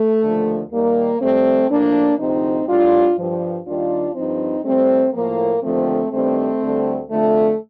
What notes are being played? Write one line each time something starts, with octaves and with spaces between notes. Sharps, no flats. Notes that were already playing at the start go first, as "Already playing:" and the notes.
Already playing: A3
D#2 D3 F3
D#2 D#3 G3 A#3
F2 C3 G3 A3 C4
A2 F3 A#3 D4
D2 C3 F3 C4 D#4
A2 G3 D4 F4
G2 F3
D#2 D#3 G3 D4 F4
G2 F3 C4 D#4
A2 G3 A3 C4
A2 F3 A#3
D#2 D3 F3 A3 C4
G2 D#3 G3 A3 C4
D2 D3 G3
F2 D3 F3 A3